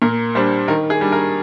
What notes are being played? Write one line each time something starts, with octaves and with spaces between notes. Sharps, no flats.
A#2 A#4
G3 D4 C5
D#3 A#4
G#4
G3 D4
A#4